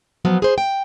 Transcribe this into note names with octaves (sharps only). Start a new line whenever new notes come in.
F3 F#3 B3
G#4 C5
G5